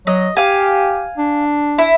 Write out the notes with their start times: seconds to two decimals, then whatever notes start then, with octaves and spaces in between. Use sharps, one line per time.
0.07 F#3 D#5
0.37 G4 F5 G#5
1.17 D4
1.78 E4